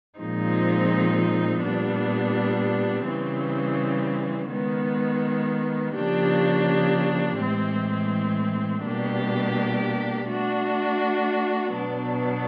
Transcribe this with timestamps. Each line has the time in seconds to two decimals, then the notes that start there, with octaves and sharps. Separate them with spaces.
0.20 A#2 F3 G#3 C4 D#4
1.63 A#2 G3 B3 D4
3.08 C#3 E3 G3 C4
4.52 D#3 G#3 B3
5.96 C#3 F3 A#3 D4 G4
7.40 A2 E3 G#3 C4
8.85 B2 G3 A#3 D4 G4
10.29 A3 D4 F#4
11.73 B2 F#3 B3 D4